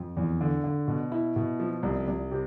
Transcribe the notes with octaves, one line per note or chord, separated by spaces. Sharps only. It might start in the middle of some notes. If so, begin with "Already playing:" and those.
Already playing: F2
E2
D3
D3
B2
E4
B2
F3
C2
C2
C3